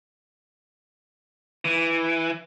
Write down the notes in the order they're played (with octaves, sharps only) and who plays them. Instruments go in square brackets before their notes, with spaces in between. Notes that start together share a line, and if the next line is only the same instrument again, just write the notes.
[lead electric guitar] E3